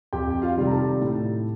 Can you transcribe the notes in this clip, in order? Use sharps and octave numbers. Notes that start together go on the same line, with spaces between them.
F2 G4 G5
F4 F5
C3 D#3 G3
A#5
A4 A5
A2